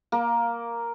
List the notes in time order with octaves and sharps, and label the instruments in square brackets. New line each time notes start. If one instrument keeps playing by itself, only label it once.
[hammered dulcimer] A#3